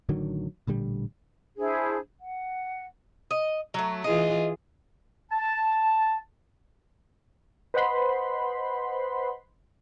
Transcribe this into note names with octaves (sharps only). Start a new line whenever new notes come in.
A1 D3 D#3 F#3
A1 A#2 D3 G3
D4 E4 G#4 C5
F#5
D#5
F#3 A3
E3 F4 G#4 D#5
A5
B4 C5 D#5 F#5 B5 C6